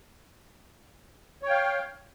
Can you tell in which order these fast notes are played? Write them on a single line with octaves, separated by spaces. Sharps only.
C#5 G5 F5